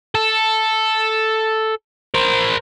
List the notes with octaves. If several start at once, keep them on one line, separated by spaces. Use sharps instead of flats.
A4
A#4 C5